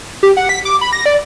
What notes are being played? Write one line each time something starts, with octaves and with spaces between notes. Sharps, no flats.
G4
F#5
B6
D6
B5
A#6
D5